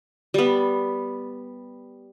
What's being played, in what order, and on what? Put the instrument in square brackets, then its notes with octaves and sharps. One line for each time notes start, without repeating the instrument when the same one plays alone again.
[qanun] G3 B3